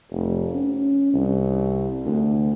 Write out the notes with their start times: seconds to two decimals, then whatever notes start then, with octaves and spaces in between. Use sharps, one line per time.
0.12 F1
0.55 C#4
1.14 C2
2.06 D2